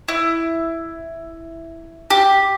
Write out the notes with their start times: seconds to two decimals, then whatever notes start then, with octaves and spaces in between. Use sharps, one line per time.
0.08 E4
2.10 G4